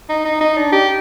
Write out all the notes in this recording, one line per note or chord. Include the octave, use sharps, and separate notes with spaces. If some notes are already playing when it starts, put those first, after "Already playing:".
D#4
D#4
D#4
D4
G4